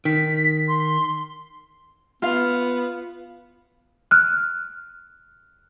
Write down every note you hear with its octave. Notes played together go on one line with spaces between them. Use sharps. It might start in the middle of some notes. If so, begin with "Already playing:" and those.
D#3 B6
C6
B3 F4 F5
F6 F#6